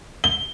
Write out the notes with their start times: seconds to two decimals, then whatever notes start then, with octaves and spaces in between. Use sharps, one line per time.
0.24 G7